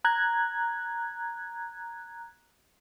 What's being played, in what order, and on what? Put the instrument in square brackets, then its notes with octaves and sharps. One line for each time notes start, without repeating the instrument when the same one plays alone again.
[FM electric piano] A#5 F#6 G#6